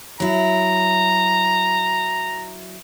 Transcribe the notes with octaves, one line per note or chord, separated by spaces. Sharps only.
F#3 E4 A#5